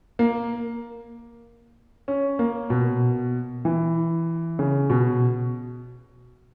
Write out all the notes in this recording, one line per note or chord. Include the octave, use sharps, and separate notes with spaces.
A#3
C#4
A#3
B2
E3
C#3
B2